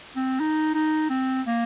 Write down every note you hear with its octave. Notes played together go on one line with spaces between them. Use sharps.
C4
D#4
D#4
C4
A#3